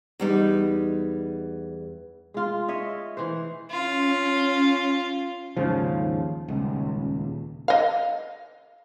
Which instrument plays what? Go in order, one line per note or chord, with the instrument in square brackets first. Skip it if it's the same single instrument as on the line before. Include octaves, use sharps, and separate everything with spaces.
[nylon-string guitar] E2 G3 D#4
[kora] G#3 F4
C#5 D#5 E5
E3 C5
[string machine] C#4 [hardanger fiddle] F4
[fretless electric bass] D#2 G#2 C#3 F3
D#1 C#2
[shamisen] D#5 F5